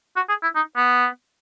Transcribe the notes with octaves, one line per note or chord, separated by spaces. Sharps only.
F#4
G#4
E4
D#4
B3